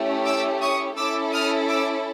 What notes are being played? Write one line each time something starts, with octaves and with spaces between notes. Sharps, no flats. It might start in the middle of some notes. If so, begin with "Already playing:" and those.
Already playing: A3 C#4 E4 G4
D6 E6
C#6 D#6
C#4 E4 A4 D6 E6
D#6 F6
D6 E6